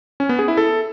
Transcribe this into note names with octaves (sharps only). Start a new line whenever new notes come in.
C#4
B3
G#4
E4
A4